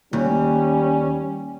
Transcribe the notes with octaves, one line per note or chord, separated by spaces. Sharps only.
D#2 G3 C#4